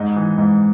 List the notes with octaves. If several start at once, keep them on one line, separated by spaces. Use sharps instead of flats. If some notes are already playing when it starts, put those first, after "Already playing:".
Already playing: G#2 D#4
E3
G#2